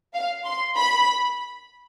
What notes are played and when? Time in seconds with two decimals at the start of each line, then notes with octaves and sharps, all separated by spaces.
0.14 F5
0.45 C6
0.76 B5